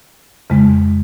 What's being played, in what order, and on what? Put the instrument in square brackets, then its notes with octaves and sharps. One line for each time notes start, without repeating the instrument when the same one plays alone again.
[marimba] F2 C#3 G#3